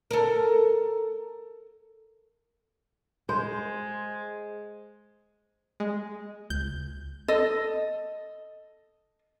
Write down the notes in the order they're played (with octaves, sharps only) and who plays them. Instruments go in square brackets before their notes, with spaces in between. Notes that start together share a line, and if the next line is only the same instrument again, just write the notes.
[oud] A4 A#4
[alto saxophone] G#3 [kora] C5
[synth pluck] G#3
[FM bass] C#2 [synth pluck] G6
[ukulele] A4 D#5